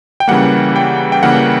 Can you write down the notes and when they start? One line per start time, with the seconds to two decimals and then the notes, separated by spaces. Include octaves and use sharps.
0.20 G5
0.28 C#3 E3 G3 A#3 F#5
0.76 G5
1.12 G5
1.23 C#3 E3 G3 A#3 F#5